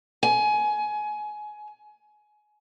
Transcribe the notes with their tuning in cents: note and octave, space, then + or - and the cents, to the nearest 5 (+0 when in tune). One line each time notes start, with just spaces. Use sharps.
G#5 +20